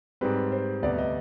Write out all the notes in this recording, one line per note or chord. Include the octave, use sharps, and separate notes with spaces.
G#2 G3 C4 B4
C5
D2 C3 G3 B3 D5
D#5